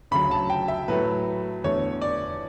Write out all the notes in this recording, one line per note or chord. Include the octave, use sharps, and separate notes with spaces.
D2 C#3 F#3 B5
A5
G5
E5
A2 F#3 A3 B4
E2 D3 A3 C#5
D5